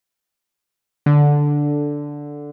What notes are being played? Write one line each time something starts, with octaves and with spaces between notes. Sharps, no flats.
D3